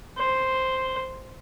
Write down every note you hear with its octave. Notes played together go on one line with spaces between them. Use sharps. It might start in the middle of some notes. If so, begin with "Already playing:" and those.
C5